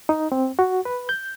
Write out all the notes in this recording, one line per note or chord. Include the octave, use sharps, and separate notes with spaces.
D#4
C4
F#4
B4
G6